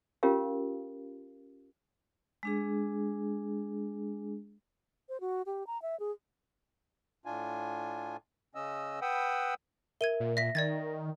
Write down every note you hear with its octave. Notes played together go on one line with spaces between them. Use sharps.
C#4 F4 G4 A#4 F5
G#3 D4 G#4
C5
F#4
G4
A#5
E5
G#4
A2 D4 F4 G#5
C#3 C#4 D#5 E6
B4 F#5 G5 B5 D#6 E6
A#4 E5 G#6 D#7 G7
A#2
E5 A#6 B6
D#3 D5 G#6 A6